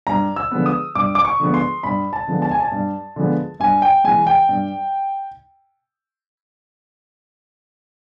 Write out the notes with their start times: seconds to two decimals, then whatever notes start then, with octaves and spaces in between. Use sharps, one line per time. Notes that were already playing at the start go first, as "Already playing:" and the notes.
0.07 G2 A#5
0.36 E6
0.51 D3 F3 G#3 B3
0.66 D#6
0.95 G2 D6
1.15 D6
1.25 C#6
1.40 D3 F3 G#3 B3
1.54 C6
1.83 G2 B5
2.13 A5
2.27 D3 F3 G#3 B3
2.42 A5
2.51 G#5
2.60 A5
2.72 G2
3.16 D3 F3 G#3 B3
3.60 G2 G#5
3.82 G5
4.04 E3 G#3 G#5
4.27 G5
4.49 G2